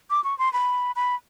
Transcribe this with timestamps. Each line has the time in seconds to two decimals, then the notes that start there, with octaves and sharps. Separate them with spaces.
0.10 D6
0.24 C#6
0.39 C6
0.53 B5
0.96 B5